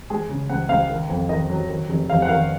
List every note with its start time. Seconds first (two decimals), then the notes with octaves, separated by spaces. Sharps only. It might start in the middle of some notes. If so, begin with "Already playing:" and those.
0.10 G#3 G#4
0.29 C#3
0.49 C#2 F#5
0.69 C#2 F5
0.90 D#3
1.09 F2
1.29 D#3 D#5
1.50 F#3
1.69 D#3
1.88 F1
2.10 F1 F5
2.22 F#5
2.28 D#3 F5